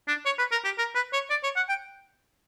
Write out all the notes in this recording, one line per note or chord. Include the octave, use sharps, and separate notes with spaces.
D4
C#5
B4
A#4
G4
A#4
B4
C#5
D5
C#5
F#5
G5